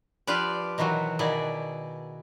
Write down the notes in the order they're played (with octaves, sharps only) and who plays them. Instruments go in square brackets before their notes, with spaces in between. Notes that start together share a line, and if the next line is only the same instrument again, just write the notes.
[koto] F3 F4 G4 B4 D5
B2 D#3 E3 F#3 F#4
B2 D#3 E4 G#4 D5